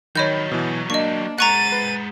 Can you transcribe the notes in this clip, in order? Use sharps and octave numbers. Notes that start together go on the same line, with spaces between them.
D#3 F#3 G3 C#5 D#5 B5 G6
B2 E3
A#3 D4 D#5 C#6
G#3 F#5 A#5 C#6 F#6 A6 D#7
B4